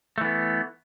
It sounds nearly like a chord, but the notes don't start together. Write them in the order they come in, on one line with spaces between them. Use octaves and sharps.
A3 E3 B3